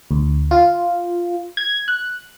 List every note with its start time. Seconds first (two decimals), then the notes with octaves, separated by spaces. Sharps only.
0.11 D2
0.51 F4
1.57 G#6
1.88 F#6